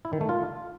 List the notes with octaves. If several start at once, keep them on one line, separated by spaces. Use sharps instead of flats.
E4
D#3
A3
F4